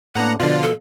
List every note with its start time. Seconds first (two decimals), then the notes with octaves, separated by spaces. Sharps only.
0.15 A2 A#3 B3 D4 F#5 A#5
0.40 B2 D3 F3 F4 D5
0.63 A4